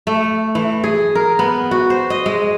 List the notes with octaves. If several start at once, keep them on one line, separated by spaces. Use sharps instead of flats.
A3
E3
G#4
A#4
B3
F#4
C5
D#5
G#3